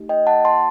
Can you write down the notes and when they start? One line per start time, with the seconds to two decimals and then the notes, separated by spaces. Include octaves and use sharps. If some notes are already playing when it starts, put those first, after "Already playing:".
Already playing: A3 D#4 G4
0.09 D#5 G5
0.27 F#5 A5
0.45 A5 C6